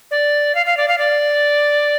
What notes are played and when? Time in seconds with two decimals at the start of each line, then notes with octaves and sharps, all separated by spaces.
0.11 D5
0.55 F5
0.66 F5
0.77 D5
0.88 F5
0.98 D5